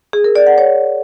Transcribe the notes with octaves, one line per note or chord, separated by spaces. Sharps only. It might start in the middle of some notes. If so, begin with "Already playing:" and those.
G#4
A#4
D5
F#5
C#5